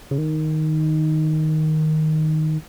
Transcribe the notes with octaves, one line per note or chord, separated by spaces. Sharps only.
C#3
D#3